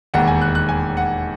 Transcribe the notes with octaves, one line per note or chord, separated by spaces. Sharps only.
E1 D#2 D#3 F#5
G#5
F#6
F#6
G#5
F#5